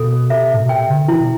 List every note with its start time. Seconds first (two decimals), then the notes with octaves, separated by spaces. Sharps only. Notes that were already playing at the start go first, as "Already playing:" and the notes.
Already playing: B2 A4
0.30 C3 E5
0.54 A2
0.62 B2
0.69 C3 G5
0.89 D3
1.08 E3 E4
1.20 B2